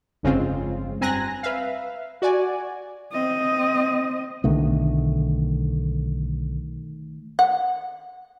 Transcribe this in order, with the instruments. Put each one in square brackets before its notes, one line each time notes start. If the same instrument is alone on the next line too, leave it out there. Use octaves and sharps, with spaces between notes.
[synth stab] G1 F2 C#3 G#3 C4 F4
G2 C4 G#5 A#5 F#6 A#6
B4 E5 F5
F#4 D5 G#5
[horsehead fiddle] C4 D#5
[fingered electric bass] B1 D3 [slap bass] D#3 A3
[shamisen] F#5